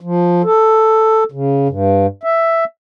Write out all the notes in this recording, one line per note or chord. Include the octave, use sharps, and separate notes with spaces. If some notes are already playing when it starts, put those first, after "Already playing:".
F3
A4
C#3
G2
E5